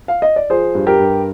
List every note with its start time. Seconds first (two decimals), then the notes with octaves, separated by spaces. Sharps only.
0.08 F5
0.22 D#5
0.36 D5
0.50 F3 G#4 C5
0.75 G2
0.87 G4 A#4
0.99 G2